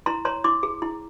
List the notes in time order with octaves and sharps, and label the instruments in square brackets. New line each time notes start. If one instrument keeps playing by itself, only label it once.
[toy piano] E4 A#5 C6
C#5 A#5 C6
E4 C6 D6
G#4
E4